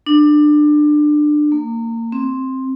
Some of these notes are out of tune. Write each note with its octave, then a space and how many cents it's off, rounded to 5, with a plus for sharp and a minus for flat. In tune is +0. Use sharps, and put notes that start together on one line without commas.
D4 +25
A#3 -30
C4 +10